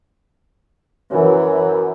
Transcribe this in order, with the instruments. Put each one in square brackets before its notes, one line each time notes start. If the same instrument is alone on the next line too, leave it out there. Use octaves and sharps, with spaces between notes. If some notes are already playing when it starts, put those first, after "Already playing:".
[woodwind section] F#2 [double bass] E3